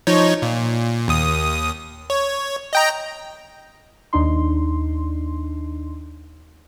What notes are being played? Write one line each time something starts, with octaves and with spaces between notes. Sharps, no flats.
F3 D#4 C#5
A#2
D#2 D#6
C#5
D#5 G5 A#5
D#2 D4 D#4 C6